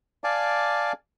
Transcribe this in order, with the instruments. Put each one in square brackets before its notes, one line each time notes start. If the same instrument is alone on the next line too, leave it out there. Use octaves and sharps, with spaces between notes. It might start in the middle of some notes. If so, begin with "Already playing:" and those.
[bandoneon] D5 F5 G#5 A5 D6